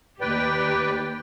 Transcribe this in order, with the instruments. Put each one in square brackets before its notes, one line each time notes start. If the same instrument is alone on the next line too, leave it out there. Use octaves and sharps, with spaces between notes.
[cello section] D#2 G4 [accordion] B4 D5 G5